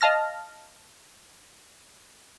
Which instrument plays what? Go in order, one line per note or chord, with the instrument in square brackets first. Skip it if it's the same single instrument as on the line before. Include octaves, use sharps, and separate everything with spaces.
[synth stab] D#5 F5 A5 F6 A#6